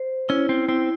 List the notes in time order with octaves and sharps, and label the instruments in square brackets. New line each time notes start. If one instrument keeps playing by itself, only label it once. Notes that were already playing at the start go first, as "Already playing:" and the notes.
Already playing: [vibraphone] C5
[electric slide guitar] C#4 [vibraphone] E4
[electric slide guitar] C4
[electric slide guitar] C4 [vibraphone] E4